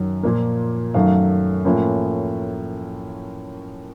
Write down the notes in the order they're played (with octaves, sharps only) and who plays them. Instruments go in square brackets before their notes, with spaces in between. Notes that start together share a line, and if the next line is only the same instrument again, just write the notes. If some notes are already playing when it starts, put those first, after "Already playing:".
Already playing: [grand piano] F#2 D#3 F#3
A#2 F3 A#3
F#2 D#3 F#3 A3 F5
A2 F3 A#3 C#4